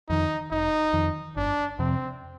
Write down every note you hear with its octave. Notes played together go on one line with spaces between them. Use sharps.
F2 D#3 D#4
F1 D#4
F2 D#3
G1 D4
F2 C3 C4